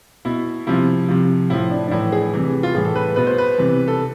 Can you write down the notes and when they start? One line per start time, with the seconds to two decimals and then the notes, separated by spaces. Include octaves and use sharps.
0.25 B2 E4
0.67 C3 F3 E4
1.08 C3 F3
1.50 A2 F3 E4
1.71 D4
1.87 D4
1.91 A2 E3 E4
2.12 G#4
2.34 C3 E3
2.63 F4
2.75 A2 E3 G#4
2.85 A4
2.95 B4
3.16 B2 B4
3.27 C5
3.38 B4
3.58 C3 E3
3.88 A4